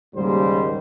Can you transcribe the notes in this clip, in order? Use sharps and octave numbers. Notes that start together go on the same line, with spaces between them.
D#2 G#2 C#3 G3 A#3 C5